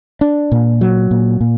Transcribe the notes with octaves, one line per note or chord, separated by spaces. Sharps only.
D4
A#2
F#3
A#2
A#2